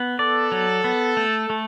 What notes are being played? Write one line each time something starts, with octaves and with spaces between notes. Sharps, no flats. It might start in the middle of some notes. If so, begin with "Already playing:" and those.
Already playing: B3
A4 D5
F#3
B3
A3
A3